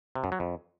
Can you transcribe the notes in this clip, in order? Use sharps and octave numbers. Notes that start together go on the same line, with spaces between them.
C3
F#2
F#3
F2